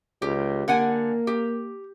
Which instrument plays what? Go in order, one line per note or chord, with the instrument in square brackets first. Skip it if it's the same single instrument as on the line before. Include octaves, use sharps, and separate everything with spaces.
[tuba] C#2 [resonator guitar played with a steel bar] G4
[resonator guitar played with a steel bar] D3 F#5 G#5 [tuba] A#3
[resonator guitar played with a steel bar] G4